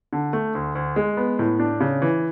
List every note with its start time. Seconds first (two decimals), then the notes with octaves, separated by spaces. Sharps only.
0.13 D3
0.33 A3
0.55 D2
0.75 D2
0.96 G#3
1.17 B3
1.39 A2
1.59 D4
1.81 C#3
2.02 E3